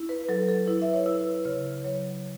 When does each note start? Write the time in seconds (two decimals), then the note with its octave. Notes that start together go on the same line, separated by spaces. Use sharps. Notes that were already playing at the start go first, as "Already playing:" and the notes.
Already playing: E4
0.09 B4
0.29 F#3 A4
0.48 A4
0.68 E4 B4
0.82 E5
0.94 C#5
1.06 E4 B4
1.45 C#3 C#5
1.84 F#3 C#5